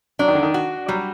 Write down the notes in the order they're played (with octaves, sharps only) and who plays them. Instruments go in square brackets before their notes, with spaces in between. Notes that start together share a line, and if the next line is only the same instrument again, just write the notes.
[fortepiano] F#3 [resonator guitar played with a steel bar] D4
[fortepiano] D#3
D3
D#3
[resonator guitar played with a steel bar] F#4
[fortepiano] F#3 [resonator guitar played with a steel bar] G3